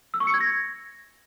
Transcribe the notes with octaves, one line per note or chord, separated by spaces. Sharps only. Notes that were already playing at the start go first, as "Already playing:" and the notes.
E6
C#6
C#7
G#6
A#6